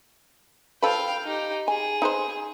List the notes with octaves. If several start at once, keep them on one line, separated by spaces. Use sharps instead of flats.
F3 A4 B4 F5 G5
D#4 G4
G#4 G#5
D#4 B4 C5